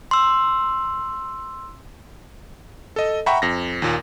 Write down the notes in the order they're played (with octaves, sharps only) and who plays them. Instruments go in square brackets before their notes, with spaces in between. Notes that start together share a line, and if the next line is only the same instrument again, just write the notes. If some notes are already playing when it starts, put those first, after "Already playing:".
[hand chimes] C6 E6
[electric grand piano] A4 D#5
E5 F#5 G5 A#5 B5 C#6
F2 A#6
D#2 A#2